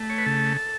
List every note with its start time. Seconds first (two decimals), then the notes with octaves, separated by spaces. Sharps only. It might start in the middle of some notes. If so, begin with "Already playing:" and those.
Already playing: A3
0.10 C#5
0.18 B4
0.26 C#3 A4